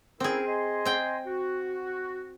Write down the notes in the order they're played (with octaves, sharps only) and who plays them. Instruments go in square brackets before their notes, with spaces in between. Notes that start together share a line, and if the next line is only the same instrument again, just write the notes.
[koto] C4 G#4 [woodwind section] C#4 E4 A#4
[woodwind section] D#5 G#5 C6
[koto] C4 G5
[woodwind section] F#4